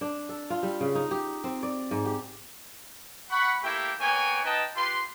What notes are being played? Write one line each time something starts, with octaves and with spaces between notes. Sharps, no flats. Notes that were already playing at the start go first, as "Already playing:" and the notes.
D4
A4
F4
G3
C#3
D#4
G4
C4
D5
G#2
G4
F#5 B5 C#6
A3 A#3 E4 G4 E5 G5
A#3 B3 C#5 G5 G#5
D#4 B4 D#5 G5 A5
F4 G4 B4 C6